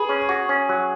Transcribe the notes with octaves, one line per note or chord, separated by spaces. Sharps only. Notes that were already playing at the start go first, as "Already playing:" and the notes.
Already playing: G#4 B4
C#4
F#4
C#4
F#3